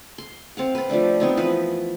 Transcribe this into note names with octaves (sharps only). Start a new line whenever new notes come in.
C6
C4 F5 F#5
C4 B4
F3 G3 A3 D4
B3 C4 D#4
E3 F3 B4